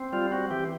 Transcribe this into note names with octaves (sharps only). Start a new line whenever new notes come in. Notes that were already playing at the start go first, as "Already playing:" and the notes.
Already playing: C4
G3 F4
C4 F#4
E3 G4